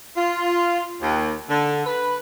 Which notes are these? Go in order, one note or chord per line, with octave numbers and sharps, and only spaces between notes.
F4
D#2
D3
B4